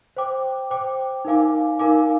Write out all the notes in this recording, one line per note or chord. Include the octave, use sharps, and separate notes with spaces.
C5 G5 D6
C5 G5 D6
D#4 A#4 F5 G#5 D6
D#4 A#4 F5 G#5 D6